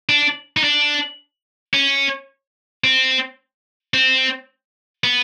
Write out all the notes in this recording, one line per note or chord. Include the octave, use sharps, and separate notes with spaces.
D4
D#4
D4
C#4
C4
C4
B3